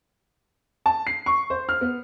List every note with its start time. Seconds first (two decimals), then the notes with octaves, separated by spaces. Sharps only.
0.86 A5
1.07 C7
1.26 C#6
1.50 C5
1.69 F6
1.81 B3